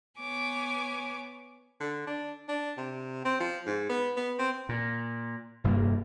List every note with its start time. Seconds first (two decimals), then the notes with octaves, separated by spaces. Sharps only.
0.21 B3 C#5 G#5 D6
1.80 D3
2.07 D4
2.48 D4
2.77 C3
3.25 C4
3.40 F3
3.66 G#2
3.89 B3
4.16 B3
4.39 C4
4.69 A#2
5.64 F1 G2 G3 A#3